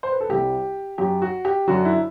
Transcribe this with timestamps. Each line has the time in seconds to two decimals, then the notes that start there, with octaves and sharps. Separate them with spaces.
0.03 C5
0.12 B4
0.20 A4
0.29 C2 C3 G3 G4
0.98 F#2 F#3 G4
1.22 F#4
1.45 G4
1.67 F#2 D3 F#3 F#4
1.85 E4